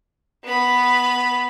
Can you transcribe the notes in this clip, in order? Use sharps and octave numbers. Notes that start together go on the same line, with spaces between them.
B3 B5